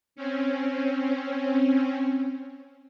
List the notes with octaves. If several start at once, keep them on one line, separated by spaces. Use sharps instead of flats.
C4 C#4